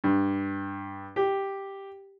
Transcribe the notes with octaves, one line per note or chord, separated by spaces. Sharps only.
G2
G4